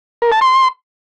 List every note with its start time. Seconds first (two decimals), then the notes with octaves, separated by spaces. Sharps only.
0.22 A#4
0.32 A5
0.41 C6